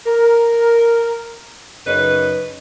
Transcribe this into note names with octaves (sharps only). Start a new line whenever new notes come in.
A#4
F#2 C#3 D#4 B4